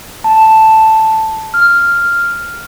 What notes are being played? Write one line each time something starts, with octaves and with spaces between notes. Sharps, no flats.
A5
F6